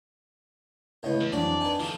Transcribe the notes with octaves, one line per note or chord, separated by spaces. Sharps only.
C#2 A2 B3 C#5 D#5
E2
F2 E3 F#3 D4 F#4 D5
B3 D#4 G#5
D#3 F3 F4 A4